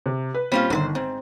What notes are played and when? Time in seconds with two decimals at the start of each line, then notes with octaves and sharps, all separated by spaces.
0.06 C3
0.34 B4
0.52 A#2 G3 C4 C#4 F4
0.70 G1 A#2 D#3 B4 C5
0.95 G#2 C4